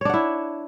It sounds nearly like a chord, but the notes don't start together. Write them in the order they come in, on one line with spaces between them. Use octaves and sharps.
C#5 D4 F#5 E4